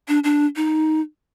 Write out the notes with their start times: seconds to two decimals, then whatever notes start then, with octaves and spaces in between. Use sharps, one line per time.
0.08 D4
0.24 D4
0.56 D#4